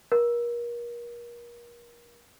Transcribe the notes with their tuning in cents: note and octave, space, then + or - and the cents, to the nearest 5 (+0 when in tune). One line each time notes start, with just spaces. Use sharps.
A#4 +35